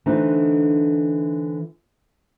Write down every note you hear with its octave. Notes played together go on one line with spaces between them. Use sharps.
D3 E3 A3 C4 D4 D#4